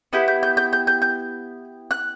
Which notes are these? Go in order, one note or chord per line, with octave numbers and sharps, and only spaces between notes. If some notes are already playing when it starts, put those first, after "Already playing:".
B3 E4 G4 G6
G6
G6
G6
G6
G6
G6
F#6